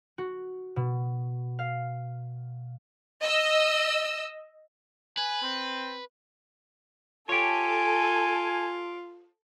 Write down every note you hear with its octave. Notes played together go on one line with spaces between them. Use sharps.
F#4
B2
F5
D#5 E6
B4 G#5
C4
F4 G4 A4 C#5 G#5